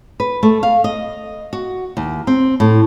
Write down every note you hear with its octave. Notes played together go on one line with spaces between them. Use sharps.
B4
A3
F5
D#5
F#4
D#2
C4
A2